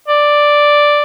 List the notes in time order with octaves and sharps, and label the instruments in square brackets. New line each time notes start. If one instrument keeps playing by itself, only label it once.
[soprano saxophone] D5